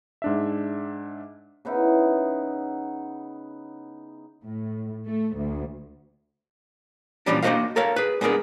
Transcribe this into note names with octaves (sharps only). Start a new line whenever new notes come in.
G#2 D4 E5
C#3 B3 D#4 E4
A2
A3
D2
A#2 E3 F3 G3 C#4 D4
A#3 D4 F#4 C5 D#5 F5
A4 A#4 C#5 F5
G#4 B4
G#3 B3 D4 G#4 A#4